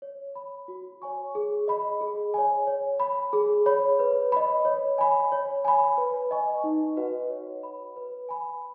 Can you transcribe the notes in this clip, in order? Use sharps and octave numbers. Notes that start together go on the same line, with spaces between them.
C#5
B5
F#4
C#5 G#5 C#6
G#4
D#5 B5
G#4
C#5 G#5
C#5
B5
G#4
C#5 B5
B4
D#5 B5
C#5
G#5 B5
C#5
G#5 B5
B4
D#5 G#5 C#6
D#4
F#4 B4 D#5 F#5
C#5
B5
B4
G#5 B5